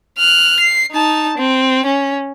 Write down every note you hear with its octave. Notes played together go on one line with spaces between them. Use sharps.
F6 F#6
C7
D#4 A5
C4
C#4